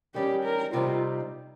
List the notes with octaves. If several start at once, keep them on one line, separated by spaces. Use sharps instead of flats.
D#3 G3 C#4 G4
A#4
C3 G3 C4 D#4 F4